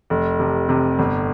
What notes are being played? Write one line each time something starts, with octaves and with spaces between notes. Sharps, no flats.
F1
C3
C3
G1